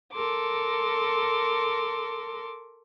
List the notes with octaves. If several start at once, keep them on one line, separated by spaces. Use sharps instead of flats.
A4 A#4 C6 D6